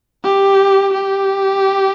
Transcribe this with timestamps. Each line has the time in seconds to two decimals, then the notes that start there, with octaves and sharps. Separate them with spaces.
0.24 G4
0.94 G4